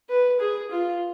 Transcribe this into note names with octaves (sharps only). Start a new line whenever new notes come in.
B4
G#4
F4